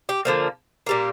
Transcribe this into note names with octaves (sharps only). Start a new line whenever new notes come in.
G4
D3 F3 A#3
A#2 G3 A#3